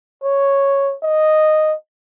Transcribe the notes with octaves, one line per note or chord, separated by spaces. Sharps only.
C#5
D#5